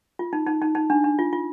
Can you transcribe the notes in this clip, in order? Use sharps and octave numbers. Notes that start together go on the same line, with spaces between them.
F4
D#4
D#4
D#4
D#4
D4
D4
F4
F4